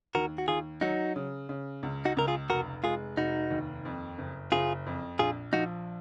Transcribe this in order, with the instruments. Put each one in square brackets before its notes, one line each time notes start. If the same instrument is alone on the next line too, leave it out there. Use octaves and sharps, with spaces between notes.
[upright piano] D#2 [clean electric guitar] F#4 A#4
[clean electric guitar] F#4
[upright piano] D#2 [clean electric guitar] F4 G#4
[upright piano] F#3 [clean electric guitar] D#4 F#4
[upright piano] C#3
C#3
C#2
[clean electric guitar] D#4 F#4
[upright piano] C#2 [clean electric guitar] A#4
[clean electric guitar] F4 G#4
[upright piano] F1 [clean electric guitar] F#4 A#4
[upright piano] G#3 [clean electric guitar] F4 G#4
[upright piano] F1 [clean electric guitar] D#4 F#4
[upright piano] D#2
F2
F#1
[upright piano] F#1 [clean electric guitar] F4 G#4
[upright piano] F2
[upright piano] A#1 [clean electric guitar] F4 G#4
[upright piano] F3 [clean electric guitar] D#4 F#4